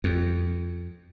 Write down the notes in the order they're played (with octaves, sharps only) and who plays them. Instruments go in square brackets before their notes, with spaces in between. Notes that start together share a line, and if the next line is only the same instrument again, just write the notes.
[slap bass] F2